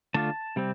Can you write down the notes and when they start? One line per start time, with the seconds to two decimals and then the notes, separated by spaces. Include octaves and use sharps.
0.14 D3 A3 D4 F4 A5
0.56 C3 G3 C4